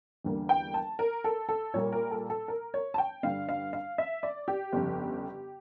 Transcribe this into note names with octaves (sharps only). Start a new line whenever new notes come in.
E2 D3 G3 A#3
G5
A5
A#4
A4
A4
A#2 G3 A#3 C#5
A#4
A4
A4
A#4
C#5
A5
G5
G2 D3 G3 D4 F5
F5
F5
E5
D5
G4
G1 F2 C#3